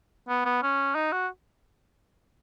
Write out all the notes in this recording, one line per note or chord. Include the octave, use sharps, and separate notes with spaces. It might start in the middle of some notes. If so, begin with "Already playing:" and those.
B3
B3
C#4
D#4
F#4